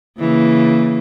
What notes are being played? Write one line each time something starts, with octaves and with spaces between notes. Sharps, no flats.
C#3 E3 A#3